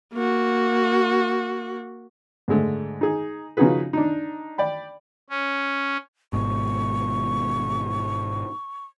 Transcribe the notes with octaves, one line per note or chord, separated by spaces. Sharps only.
A#3 F#4
G#2 D3 G#3 A3
D#4 G#4
C#3 F3 D#4 F#4 G#4 B4
D4 D#4
D5 G5 B5
C#4
G#1 G#2 B2 C#6